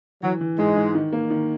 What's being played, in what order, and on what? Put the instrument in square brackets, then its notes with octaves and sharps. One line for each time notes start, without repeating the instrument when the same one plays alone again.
[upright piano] E3 [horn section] F#3
[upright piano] E3
[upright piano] G#2 [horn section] G#3
[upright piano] G#2
D#3
A#3
D#3